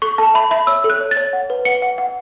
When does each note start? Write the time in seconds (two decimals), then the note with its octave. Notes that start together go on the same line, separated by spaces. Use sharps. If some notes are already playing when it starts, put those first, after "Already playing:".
0.02 A4 C#6
0.18 A4 A5
0.34 E5 B5
0.51 E5 B5
0.67 C#5 E6
0.84 A4
0.90 F#6
1.01 C#5
1.11 A6
1.17 C#5
1.33 F#5
1.50 B4
1.65 F#5 C#7
1.82 F#5
1.98 F#5